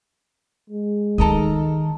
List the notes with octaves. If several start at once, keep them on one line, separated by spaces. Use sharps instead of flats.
G#3
D#3 D#4 A4 A#4 D#5